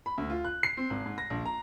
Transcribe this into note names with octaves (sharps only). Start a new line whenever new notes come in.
B5
D2
F4
F#6
C7
C4
G#1
G#2
A#6
A#1
A#5